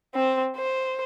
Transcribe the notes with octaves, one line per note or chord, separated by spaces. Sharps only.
C4 C5
C5